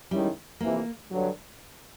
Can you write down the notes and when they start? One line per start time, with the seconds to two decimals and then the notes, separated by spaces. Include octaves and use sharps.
0.11 D#3 G3 G#3 C#4 E4
0.60 F2 C3 E3 A#3
1.10 G2 D3 F#3